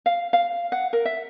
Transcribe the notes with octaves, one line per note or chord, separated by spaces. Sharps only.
F5
F5
F#5
A#4
E5